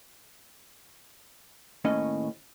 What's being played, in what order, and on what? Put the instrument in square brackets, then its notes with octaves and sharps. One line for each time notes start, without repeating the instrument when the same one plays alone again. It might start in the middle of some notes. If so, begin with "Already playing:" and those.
[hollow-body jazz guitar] D#2 A2 C#4 D#5